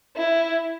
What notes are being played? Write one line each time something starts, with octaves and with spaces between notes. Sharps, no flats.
E4